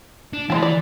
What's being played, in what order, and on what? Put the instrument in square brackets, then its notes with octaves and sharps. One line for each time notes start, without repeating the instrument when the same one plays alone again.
[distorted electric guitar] D4
[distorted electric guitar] E3 [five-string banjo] G#3 C4 A5
[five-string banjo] D5